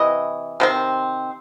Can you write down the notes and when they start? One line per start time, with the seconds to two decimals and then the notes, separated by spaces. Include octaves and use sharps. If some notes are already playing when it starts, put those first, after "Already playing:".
Already playing: C3 E3 D#5
0.60 C3 D#3 C4